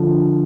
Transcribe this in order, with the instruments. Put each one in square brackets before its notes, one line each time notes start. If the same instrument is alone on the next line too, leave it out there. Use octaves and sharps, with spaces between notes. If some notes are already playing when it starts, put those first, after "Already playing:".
Already playing: [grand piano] D3 F3